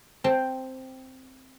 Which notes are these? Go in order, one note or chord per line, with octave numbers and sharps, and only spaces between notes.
C4 C5 G5 A5